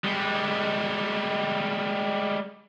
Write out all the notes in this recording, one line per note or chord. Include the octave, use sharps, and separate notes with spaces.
G3 G#3